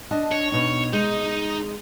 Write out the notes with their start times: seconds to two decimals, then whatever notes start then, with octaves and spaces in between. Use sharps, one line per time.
0.11 D4 D#5 A5
0.32 C#5
0.52 B2 D#4
0.93 G#3 D#4